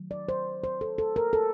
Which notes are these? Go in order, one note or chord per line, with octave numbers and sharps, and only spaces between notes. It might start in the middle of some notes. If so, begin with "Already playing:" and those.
Already playing: D#3 F#3 A3
D5
C5
C5
A4
A4
A#4
A4